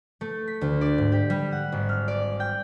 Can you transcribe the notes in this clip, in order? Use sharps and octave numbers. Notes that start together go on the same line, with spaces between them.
A3
B6
D2
D5
G#2
G4
G3
F#5
G#1
F6
D5
G5